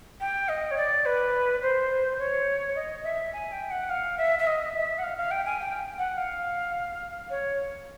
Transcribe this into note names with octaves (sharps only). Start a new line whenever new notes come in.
G5
D#5
C#5
D5
B4
C5
C#5
D#5
E5
G#5
G5
F#5
F5
E5
E5
D#5
E5
F#5
F5
F5
G5
G#5
G5
F#5
F5
C#5